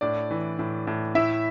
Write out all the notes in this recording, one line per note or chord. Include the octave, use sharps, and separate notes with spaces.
A2 D4 D5
E3
A2
A2
A2 E4 E5